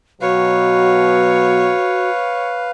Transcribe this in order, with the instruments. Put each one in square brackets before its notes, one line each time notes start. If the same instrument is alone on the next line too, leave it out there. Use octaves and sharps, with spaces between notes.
[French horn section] B2 F#3 [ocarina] F#4 [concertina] B4 F5 [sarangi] C#5